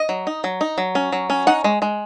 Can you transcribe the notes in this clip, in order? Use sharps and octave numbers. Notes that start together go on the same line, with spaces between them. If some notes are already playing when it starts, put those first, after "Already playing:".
Already playing: D#5
F#3
D#4
F#3
D#4
F#3
C#4
F#3
C#4
D#4 F#5
G#3
G#3